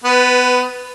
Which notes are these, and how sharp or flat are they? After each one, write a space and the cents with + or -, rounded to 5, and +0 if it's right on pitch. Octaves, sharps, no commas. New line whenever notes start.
B3 +20 B4 +0